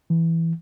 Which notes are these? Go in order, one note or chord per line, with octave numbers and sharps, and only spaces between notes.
E3